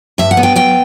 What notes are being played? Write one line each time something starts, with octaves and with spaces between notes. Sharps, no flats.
G2 E5
F#5
B3
G5
F#3 G5